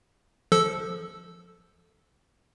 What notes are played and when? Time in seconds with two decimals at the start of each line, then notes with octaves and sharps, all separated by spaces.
0.52 F3 A4 E6